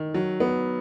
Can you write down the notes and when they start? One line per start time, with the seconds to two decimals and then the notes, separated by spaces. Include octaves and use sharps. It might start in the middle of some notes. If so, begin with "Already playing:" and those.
Already playing: D#3
0.14 F#3
0.40 B3